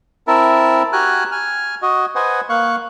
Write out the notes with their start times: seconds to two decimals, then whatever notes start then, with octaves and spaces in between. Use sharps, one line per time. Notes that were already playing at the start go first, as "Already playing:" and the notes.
0.28 C4 E4 A#4 E5 A5
0.93 F#4 G4 G#5 A#5 F6 F#6
1.31 G#5 F6
1.82 F#4 D#5
2.15 B4 C5 D#5 F#5 G#5
2.49 A#3 F5 C#6 F#6